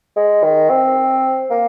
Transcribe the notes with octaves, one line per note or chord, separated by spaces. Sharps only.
G#3
D#3
C4
A#3